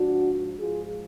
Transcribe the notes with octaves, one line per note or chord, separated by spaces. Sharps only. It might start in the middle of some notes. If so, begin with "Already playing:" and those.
Already playing: G#2 F3 D4 F#4
G#2 F3 F4 G#4